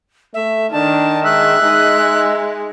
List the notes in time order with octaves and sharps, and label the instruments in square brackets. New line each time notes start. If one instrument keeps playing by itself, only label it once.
[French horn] A3 [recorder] E5
[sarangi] D#3 [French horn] D4 [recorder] A5
[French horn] G#3 [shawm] E5 [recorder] F#6
[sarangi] G#3 [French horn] D#4